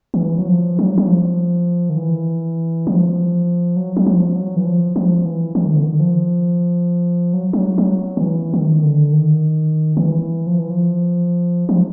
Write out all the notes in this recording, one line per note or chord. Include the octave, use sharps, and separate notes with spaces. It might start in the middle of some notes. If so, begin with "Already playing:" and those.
D#3
E3
F#3
F3
F#3
F#3
F3
D#3
E3
F3
F#3
F#3
F3
F#3
E3
F3
F3
E3
E3
D#3
D3
D#3
F3
F#3
F#3
F#3
D#3
E3
D#3
D3
D#3
D#3
E3
F3
E3
F3
F3